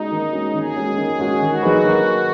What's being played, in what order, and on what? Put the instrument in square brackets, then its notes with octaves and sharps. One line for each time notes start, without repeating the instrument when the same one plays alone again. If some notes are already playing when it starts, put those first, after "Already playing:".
Already playing: [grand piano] G#3 C#4 F#4 [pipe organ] D#4
[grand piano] D#3
G#3 C#4 F#4
[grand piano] D#3 [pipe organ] G#4
[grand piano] G#3 C#4 F#4
D#3
G#3 C#4 F#4
[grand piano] D#3 [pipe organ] F#4
[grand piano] F#3 D#4 G#4 B4
D#3